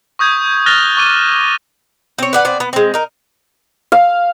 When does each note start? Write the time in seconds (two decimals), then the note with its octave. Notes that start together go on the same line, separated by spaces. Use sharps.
0.19 C#6 D#6 G6 G#6
0.66 F6 F#6 A6 A#6 F7 G7
0.97 C#6 D6 D#7
2.18 C4 C#5
2.33 B4 D5 F#5
2.45 B3 C4 D5
2.60 B3
2.73 G#3 C4
2.94 D#4 A#4
3.92 F5